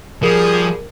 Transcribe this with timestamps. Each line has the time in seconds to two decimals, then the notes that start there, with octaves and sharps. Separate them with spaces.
0.23 F3 G3 G#4 A#4